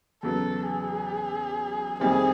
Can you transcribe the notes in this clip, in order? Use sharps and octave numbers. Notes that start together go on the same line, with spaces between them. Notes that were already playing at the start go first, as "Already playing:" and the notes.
E2 C#3 F#3 B3 A4
G#4
F2 C3 D#3 G3 C4 G#4